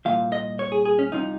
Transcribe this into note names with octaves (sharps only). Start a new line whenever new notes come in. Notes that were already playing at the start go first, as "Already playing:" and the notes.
C2 A#2 F3 F5
D#5
C#5
G#4
G#4
C#4
C2 C3 F3 D#4